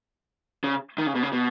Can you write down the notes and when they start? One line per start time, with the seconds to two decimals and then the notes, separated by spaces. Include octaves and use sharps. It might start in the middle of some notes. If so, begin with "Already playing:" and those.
0.64 C#3
0.98 D#3
1.07 C#3
1.15 B2
1.23 C#3
1.32 B2